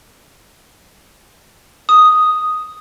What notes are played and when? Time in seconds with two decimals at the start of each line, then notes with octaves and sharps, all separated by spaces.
1.89 D#6